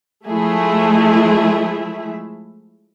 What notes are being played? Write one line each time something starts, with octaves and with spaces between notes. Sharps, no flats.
F3 G#3 A3 E4 G#4 E5